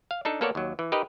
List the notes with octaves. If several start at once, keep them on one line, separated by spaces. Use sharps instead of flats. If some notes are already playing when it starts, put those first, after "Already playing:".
F5
D4 D#4 A4
A#3 B3 A4 A#4 C#5 D5
D#2 F#3
E3
D#4 G4 A#4 B4 D#5